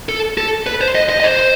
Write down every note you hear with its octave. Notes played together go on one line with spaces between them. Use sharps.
A4
A4
B4
C5
D#5
D#5
D#5
C5